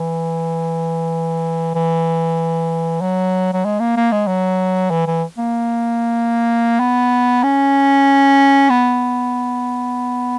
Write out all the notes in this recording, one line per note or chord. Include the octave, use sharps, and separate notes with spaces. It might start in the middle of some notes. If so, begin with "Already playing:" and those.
Already playing: E3
E3
F#3
F#3
G#3
A#3
A#3
G#3
F#3
E3
E3
A#3
B3
C#4
B3